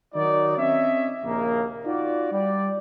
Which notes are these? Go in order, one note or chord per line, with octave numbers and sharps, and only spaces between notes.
D#3 F#3 D#4 F#4 D5
C4 C#4 C#5 D#5 E5
A#1 D#2 C#3 A#3
D#4 F4 F#4 D5
G3 D5